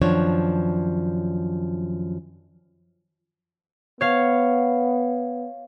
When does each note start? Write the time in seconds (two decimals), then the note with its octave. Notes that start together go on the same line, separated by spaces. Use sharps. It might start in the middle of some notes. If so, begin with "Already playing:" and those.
0.02 F#2 D#3 F3 D4 C#5
4.01 B3 C#5 F5